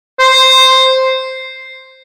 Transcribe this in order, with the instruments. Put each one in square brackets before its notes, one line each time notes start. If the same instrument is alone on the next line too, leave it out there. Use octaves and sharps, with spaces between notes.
[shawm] C5